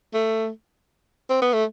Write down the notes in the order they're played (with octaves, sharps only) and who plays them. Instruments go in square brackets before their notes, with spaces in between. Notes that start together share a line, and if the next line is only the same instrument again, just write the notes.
[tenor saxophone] A3
C4
B3
A3